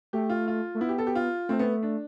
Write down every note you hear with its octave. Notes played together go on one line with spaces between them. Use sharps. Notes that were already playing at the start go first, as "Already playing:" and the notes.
A3 G4
F4
F4
A3
B3 E4
G4
A4
G4
F4
A3 C4
B3
D4